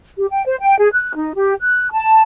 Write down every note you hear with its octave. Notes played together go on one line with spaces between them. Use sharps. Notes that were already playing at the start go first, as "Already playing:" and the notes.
G4
G5
C5
G5
G#4
F#6
D#4
G4
F#6
A5